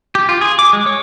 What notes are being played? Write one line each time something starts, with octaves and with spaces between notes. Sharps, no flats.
G4
F4
G#4
D6
G#3
C#5